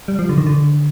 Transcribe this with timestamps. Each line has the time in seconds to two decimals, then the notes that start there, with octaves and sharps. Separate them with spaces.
0.08 G3
0.19 F3
0.29 D3
0.38 D#3
0.47 D3